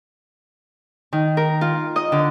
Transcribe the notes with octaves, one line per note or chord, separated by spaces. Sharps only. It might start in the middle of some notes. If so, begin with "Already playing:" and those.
D#3
A#4
F4
D#5
D3